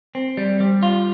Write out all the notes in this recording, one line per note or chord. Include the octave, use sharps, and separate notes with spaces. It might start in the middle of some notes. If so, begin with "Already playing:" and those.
C4
G3
G3
F4